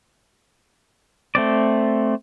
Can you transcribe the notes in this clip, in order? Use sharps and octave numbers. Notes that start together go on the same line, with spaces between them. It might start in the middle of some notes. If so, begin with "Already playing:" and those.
A3 C4 D5